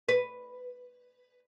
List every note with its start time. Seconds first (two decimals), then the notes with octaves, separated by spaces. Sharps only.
0.09 B4